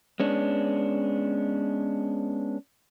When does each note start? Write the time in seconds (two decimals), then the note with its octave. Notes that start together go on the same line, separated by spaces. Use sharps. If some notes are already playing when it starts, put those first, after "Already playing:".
0.20 G#3 B3 C#4 D4